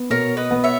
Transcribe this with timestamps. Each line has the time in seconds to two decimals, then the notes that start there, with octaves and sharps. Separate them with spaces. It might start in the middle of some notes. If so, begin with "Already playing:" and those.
Already playing: B3
0.10 B2 A#4 C#5
0.37 B4 D#5
0.51 B3
0.64 C#5 E5